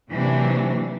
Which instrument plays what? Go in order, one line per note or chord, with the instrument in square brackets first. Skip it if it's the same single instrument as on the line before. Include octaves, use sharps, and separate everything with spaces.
[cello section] C3 E3 F#3 A#3 D4